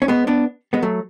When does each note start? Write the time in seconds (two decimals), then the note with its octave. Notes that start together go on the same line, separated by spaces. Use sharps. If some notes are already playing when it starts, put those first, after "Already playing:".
0.02 C#4
0.08 G#3 B3
0.27 B3 D4
0.73 G#3 B3
0.82 F#3 A3